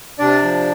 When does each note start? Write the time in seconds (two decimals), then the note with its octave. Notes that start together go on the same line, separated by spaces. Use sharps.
0.19 C3 D4 D5
0.42 F3